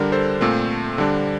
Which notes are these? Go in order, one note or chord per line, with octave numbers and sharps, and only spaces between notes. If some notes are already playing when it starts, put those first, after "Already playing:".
Already playing: D3 G3 D4 A#4
A4 C5
A#2 A3 C4
D3 G3 D4